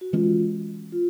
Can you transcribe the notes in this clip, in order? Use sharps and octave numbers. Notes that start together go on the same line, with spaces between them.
F#4
E3 G#3 C#4 F4
F4